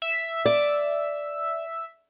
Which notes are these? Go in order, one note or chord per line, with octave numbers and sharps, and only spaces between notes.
E5
D5